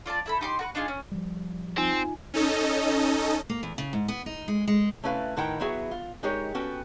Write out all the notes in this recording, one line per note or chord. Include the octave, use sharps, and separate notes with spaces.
F4 D5 E5 A5
E4 A4 B5
D#4 G4 C6
F#4 A#4 B4
D4 D#4 F4 G#4
C#4
F3 G3
C4 D#4 F4 G#5
C#4 D#4 A4 D#5
A#3
E2
C#3
G#2
B3
D#4
G#3
G#3
C3 A3 C#4 E4 B4 F5
A2 D#3 E4 F#5 G5 A#5
F#3 B3 E4 F#4 G#4 E5
F4
G#3 D#4 G4 G#4 A#4 C#5
B3 C#4 F#4 A4 B4 G5